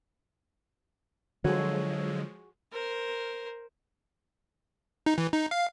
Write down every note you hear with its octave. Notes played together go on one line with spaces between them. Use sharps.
D3 F3 F#3 G#3 F#4 G#4 A4 C#5
A#4 C5
D#4
E3
D#4
F5